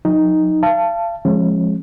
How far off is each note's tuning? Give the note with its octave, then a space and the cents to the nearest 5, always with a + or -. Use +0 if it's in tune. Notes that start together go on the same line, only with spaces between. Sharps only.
F#3 -45 D#4 +0
F5 -35 A5 +0
F3 +0 G#3 +0 C#4 -35